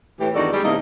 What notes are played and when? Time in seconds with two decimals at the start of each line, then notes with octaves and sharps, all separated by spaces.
0.20 A2 E3 G4
0.34 E2 G2 D#3 F#4 A4 D5
0.53 G3 G#3
0.65 E2 C3 A3 A#3 C#4 D#4